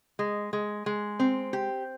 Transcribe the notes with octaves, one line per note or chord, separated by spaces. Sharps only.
G#3
G#3
G#3
C4
G4